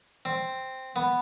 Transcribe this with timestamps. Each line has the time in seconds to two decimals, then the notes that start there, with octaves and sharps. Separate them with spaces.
0.25 C4
0.96 B3